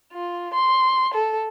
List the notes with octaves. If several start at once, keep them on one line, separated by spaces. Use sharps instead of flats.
F4
C6
A4